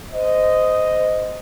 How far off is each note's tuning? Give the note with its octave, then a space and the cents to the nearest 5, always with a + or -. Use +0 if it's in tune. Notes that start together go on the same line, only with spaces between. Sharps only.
C5 -25 D#5 +0